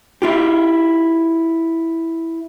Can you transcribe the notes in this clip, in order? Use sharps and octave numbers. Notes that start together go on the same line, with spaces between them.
E4 F4 G4